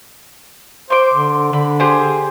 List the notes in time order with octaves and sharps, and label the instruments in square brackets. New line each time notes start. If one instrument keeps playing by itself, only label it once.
[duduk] C5 [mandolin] C6 D6
[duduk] D3
[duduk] D3 [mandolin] B5
[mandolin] G4 G#4 C5